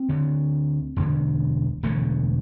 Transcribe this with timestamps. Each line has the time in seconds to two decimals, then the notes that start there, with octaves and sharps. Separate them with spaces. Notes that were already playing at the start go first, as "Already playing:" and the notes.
Already playing: C4
0.09 D2 D3
0.96 E1 D2 D3
1.83 E1 E2 D3 A3